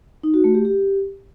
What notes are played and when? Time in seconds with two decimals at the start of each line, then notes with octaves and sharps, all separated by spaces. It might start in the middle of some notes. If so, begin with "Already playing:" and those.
0.23 D#4
0.34 F#4
0.44 A3
0.55 G4
0.65 G4